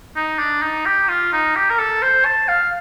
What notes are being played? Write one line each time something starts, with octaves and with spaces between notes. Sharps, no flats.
D#4
D4
D#4
G4
F4
D#4
G4
A#4
A4
C5
A5
F5